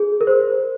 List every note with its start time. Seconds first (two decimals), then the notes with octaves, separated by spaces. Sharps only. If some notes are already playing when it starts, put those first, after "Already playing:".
Already playing: G#4
0.21 A#4
0.27 C5